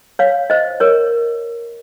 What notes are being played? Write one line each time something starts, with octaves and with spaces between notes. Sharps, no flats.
C#5 F5
C5 D#5
A#4 C#5